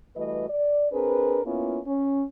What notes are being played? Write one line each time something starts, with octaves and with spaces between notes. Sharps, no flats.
E3 G3 A3 F#4 B4 D#5
D5
C4 D4 G#4 A#4 B4
A#3 B3 C#4 E4 F4
C#4